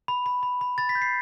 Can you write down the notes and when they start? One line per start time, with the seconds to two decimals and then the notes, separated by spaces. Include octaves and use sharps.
0.08 B5
0.26 B5
0.43 B5
0.61 B5
0.78 B5 A6
0.89 B6
0.95 G6
1.02 C7